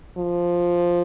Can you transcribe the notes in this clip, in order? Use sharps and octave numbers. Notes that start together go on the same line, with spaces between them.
F3